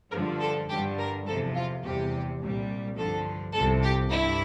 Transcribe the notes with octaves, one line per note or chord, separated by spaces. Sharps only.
G2 D3 F3 A#4
A4
G2 D3 G3 G4
A#4
E2 C3 F3 A4
F4
E2 C3 G3 G4
C2 A#2 G3
G2 D3 F3 A4
C2 C3 F3 A4
G4
G2 E4